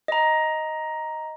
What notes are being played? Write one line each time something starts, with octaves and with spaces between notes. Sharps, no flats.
D#5 A#5